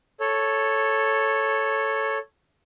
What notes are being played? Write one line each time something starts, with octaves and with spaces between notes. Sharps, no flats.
A4 C#5